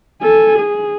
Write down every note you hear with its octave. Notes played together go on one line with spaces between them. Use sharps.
A4 G#5
G#4